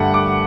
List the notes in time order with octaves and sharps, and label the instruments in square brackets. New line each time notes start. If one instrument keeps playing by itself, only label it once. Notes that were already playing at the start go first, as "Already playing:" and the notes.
Already playing: [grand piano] G2 D3 A3 F#5
D6